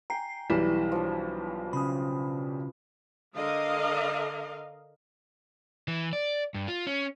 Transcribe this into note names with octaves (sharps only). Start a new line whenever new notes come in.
G5 G#5 A#5 C7
B1 E3 G3 E4 B4
F3 D4
C#3 B5 D#6
D3 A#4 D#5 F5
E3
D5
G2
F4
C#4